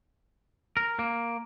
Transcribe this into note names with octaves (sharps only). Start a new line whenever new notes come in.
A#4
A#3